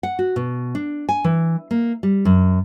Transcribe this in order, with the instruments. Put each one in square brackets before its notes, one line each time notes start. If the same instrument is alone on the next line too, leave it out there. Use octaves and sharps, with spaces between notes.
[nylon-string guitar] F#5
F#4
B2
D4
G#5
E3
A#3
G3
F#2